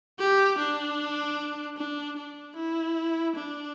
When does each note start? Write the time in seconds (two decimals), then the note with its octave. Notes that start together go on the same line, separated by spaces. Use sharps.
0.19 G4
0.58 D4
1.77 D4
2.17 D4
2.56 E4
3.36 D4